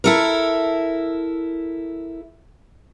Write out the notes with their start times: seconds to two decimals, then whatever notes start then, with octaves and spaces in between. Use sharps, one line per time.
0.04 E4 A4 A#4